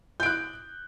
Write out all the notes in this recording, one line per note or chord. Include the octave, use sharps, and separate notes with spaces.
F#6 G6 D7